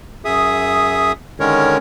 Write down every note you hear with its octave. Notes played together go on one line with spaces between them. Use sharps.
F#2 G#4 E5 D#6
D3 D#3 G#3 C#4 A#4 C#5